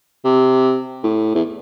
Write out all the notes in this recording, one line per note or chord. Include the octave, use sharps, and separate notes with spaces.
C3
A2
E2